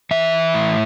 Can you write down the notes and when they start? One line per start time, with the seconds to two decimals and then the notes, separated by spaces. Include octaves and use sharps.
0.11 E3 E5
0.54 A2